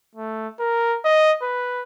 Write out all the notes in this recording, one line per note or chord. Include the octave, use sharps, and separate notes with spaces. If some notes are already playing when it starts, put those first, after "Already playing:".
A3
A#4
D#5
B4